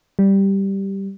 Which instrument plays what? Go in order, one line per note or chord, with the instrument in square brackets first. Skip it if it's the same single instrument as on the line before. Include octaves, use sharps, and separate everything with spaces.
[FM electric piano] G3